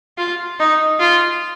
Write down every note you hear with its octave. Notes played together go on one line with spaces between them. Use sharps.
F4
D#4
F4